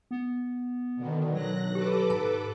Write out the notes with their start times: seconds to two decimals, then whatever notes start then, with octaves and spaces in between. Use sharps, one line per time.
0.11 B3
0.96 B2 D3 D#3
1.34 F#3 F#6 A#6
1.75 G4 A4 B4 D6
2.10 G#2 A5